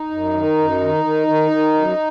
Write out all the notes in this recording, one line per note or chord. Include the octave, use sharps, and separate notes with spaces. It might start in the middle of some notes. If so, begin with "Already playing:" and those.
Already playing: D#4
F#2
D#3
F#2
D#3
D#3
D#3
D#3
F#2